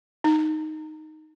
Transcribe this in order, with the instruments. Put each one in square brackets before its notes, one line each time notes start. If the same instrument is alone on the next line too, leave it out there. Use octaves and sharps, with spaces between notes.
[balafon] D#4